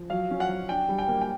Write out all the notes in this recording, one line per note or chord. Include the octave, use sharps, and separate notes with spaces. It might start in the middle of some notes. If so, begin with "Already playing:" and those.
Already playing: F3
F#3 F5
C#4
F#5
F#3
D4 G5
G3
G5
A#3
G5